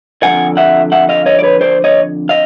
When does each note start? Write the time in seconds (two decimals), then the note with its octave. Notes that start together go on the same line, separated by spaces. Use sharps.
0.23 F2 D3 F3 F#5 G#5
0.57 E5 F#5
0.92 E5 F#5
1.09 D#5 F5
1.26 C#5 D#5
1.39 D5
1.43 B4 C#5
1.61 C5 D5
1.84 C#5 D#5
2.29 D#5 F5